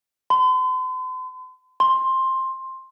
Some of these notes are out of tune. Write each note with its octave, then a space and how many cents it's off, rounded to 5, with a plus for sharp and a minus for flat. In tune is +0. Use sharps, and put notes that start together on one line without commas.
C6 -45
C6 +10